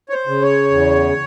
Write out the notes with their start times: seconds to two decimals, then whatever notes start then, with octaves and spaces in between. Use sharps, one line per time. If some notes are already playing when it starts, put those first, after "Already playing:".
0.09 C#5
0.13 C5
0.27 C#3
0.42 C#5
0.71 E2